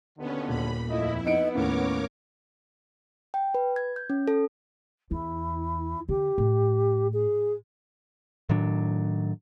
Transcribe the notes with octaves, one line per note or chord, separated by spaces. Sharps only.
D#2 B2 D3 B3 C#4
D#1 B5
F2 A3 E4 F4 D#5
B3 D#4 D#5 C#7 D7
D#2 A2 C#4 A#4 C#5 D6
G5
B4
G#6
G6
C#4
A4
E2 E4
D3 G4
A2
G#4
A2 D#3 F#3 D4